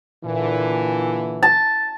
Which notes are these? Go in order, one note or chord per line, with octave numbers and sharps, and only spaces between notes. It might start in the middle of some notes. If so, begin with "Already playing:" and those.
A#2 D3 E3
A5